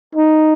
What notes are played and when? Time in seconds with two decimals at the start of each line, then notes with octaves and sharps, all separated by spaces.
0.15 D#4